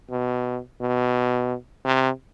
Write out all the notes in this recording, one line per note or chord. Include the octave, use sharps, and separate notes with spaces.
B2
B2
C3